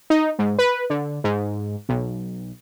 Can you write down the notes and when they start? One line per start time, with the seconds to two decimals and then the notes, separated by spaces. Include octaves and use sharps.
0.10 D#4
0.39 G#2
0.58 B4
0.90 D3
1.24 G#2
1.89 B1